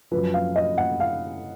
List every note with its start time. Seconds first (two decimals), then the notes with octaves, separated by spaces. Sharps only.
0.11 F#2 F3 B4
0.34 F5
0.56 D#5
0.78 F#5
1.00 F5